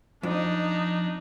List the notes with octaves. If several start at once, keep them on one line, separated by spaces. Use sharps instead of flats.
F2 D4 D#4